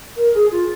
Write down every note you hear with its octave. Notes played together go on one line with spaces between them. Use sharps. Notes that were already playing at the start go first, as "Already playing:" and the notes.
A#4
G#4
F4